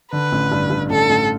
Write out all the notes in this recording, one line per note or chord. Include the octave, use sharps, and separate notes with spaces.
D3 B4
A1
G2
G2
A1 A4
A1